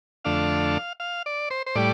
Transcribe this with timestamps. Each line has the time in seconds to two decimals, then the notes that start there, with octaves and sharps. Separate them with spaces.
0.25 F2 D3 A3 D4 F5
1.00 F5
1.26 D5
1.50 C5
1.66 C5
1.75 A2 G3 D5